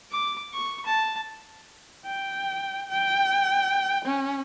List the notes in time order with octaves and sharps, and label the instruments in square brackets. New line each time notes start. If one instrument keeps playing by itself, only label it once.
[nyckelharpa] D6
C#6
A5
[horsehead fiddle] G5
G5
C#4